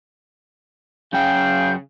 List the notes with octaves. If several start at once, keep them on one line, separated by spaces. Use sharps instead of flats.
F#2 C#3 G5 G6